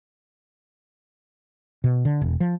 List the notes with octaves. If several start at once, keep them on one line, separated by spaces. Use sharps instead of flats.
B2
D3
E1
F3